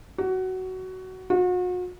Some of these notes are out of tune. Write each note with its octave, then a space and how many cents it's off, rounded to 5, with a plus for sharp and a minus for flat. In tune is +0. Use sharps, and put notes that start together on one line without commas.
F#4 +15
F#4 -40